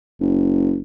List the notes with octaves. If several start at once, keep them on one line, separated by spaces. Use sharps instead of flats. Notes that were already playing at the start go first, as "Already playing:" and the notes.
F#1